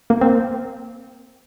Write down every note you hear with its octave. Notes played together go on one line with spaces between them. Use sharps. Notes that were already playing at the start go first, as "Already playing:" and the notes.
A#3
C4